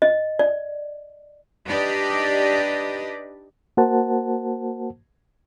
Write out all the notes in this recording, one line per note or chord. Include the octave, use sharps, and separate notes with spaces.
D#5
D5
D4 D#4 G4 B4 D5 D#5
A#3 F#4 A#4 C5 F#5 A5